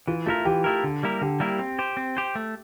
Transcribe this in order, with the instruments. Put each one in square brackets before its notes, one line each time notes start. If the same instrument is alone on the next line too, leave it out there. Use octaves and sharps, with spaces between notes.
[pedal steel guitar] E3 [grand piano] F4
[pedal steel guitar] A3 E4 A#4 [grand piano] F4
[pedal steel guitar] E3 [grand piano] G4
[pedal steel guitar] A3 E4 A#4
D3
G3 A#3 E4 A#4
[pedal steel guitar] D3 [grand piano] G4
[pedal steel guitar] G3 A#3 E4 A#4
C4
G4 C5
C4
G4 C5
A3